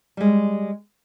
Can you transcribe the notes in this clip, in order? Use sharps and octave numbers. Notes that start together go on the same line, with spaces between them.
G3 G#3